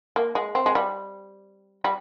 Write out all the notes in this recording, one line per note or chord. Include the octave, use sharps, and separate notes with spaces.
A#3
G#3
C4
G#3
G3
G3